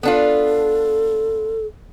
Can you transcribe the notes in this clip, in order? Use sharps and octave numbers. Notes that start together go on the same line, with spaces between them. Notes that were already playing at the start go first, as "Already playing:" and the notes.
B3 D4 F4 A4